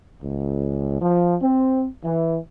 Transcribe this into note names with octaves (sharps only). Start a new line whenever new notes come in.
C#2
F3
C4
E3